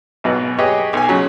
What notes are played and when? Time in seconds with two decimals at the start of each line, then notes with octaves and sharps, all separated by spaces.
0.24 G#1 B2 F#3 B4
0.58 G4 G#4 B4 C#5 D#5
0.93 B1 G#5
1.08 C#3 F#3 C#4